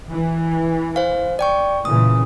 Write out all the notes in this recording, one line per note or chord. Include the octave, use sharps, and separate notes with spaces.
E3
C5 F5
D5 G5 C#6
A#2 C#3 E3 D#6